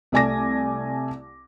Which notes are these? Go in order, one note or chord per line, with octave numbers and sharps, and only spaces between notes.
C2 A3 D5 G#5 D6 A#6